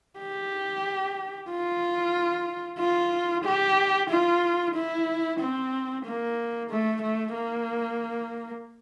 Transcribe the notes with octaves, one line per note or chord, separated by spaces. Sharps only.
G4
F4
F4
G4
F4
E4
C4
A#3
A3
A3
A#3